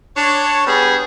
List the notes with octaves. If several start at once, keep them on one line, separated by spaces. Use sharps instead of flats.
D4 C#5
G3 B3 G#4